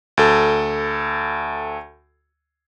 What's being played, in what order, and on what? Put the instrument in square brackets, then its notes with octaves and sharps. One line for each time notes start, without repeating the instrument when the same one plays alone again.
[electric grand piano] D2 A4